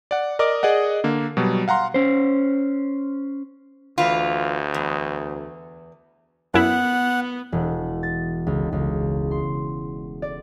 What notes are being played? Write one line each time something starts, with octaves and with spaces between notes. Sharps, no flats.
D5 F#5
A#4 D5 D#5 D6
G#4 D5 D#5 F#5
D3 A#3
B2 F#3 G3
F5 F#5 A#5 C6
C#4 C5
D2 E3 F4
E2
F#2 B3 E4 F#5
E1
A6
C#2
C#2
C6
D5